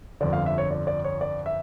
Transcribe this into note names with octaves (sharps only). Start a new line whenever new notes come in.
G1 F2 D3 D5
F5
E5
C#5
D5
D5
C#5
D5
E5